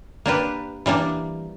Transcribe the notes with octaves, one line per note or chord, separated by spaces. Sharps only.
A#3 D4 G4 B4
E3 G3 A#3 D4